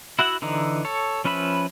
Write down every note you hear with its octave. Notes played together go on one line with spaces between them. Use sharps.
E4 F#4 E5 F#5
D3 E3 D#4
A4 C#5
F3 C#4 B4 E5 B5